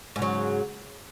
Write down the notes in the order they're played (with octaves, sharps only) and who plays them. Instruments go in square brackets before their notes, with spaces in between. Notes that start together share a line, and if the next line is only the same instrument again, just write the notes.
[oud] G#2
C#3
F#3